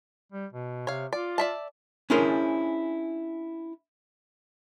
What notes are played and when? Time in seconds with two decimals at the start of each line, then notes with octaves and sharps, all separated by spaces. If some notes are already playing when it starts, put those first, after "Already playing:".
0.32 G3
0.53 B2
0.87 C3 C#5 F5
1.13 F4 D5
1.38 D5 E5 A5
2.10 C#4 D4 E4 G#4 A#4 C5